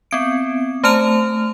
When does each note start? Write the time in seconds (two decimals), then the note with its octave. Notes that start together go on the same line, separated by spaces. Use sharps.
0.11 B3 C4 D7
0.84 A3 C5 A5 A#5 F6 F7